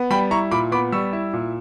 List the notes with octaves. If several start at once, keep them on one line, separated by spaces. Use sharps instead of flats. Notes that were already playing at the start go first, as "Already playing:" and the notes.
Already playing: B3
G3 G5 B5
E4 A#5 C#6
A#2 B5 D6
B3 B5 D6
G3 C#6 E6
E4
A#2